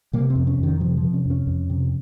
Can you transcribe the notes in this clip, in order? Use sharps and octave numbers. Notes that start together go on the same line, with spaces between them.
C3 A#3
C4
F2
C#4
F2 D#3
C3 F3
F3
C3
C#4
F2 C#4
F2
C3